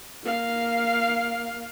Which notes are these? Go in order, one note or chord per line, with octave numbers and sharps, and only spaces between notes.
A#3 F5